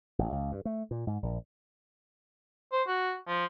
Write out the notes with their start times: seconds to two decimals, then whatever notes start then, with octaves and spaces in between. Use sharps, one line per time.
0.19 A1
0.32 C#2
0.52 G2
0.65 A3
0.91 A#2
1.07 G#2
1.23 A#1
2.72 C5
2.87 F#4
3.27 F3